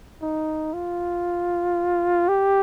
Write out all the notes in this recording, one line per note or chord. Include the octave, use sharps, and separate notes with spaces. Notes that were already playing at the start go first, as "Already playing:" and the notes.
D#4
F4
G4